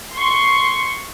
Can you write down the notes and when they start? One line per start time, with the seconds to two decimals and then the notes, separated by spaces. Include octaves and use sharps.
0.15 C6 C#6